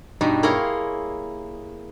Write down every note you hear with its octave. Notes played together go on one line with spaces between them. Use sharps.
G2 B2 D4 D#4
A#3 E4 G#4 C#5 F5 C6